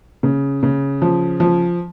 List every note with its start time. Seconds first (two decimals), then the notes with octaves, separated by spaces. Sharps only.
0.23 C#3
0.63 C#3
1.02 F3
1.40 F3